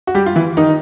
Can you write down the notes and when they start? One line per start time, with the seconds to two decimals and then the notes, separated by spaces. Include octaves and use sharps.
0.07 F#4
0.14 G3 G4
0.26 F4
0.36 E3 E4
0.57 D#3 D#4